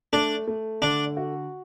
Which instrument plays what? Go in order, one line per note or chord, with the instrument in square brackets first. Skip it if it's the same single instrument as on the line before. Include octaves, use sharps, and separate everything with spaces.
[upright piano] A3 [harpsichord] D4
[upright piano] A3
[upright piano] D3 [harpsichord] D4
[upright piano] F#4